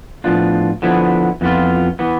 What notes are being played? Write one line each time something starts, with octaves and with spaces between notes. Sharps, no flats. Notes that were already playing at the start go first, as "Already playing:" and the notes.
A2 F3 B3 D4 F4
D3 F3 B3 E4
F2 E3 B3 F4
E3 B3